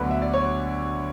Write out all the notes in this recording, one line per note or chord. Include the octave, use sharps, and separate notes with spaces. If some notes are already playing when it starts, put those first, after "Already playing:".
Already playing: D2 D3 F#3 B3 B4
E5
D5
C#5